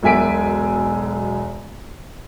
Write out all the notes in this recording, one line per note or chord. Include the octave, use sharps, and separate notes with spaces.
E1 B1 E5 G#5 B6 D7